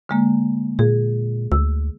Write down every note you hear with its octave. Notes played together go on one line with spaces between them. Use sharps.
D3 G#3 A#3
A#2 G#4
D2 E6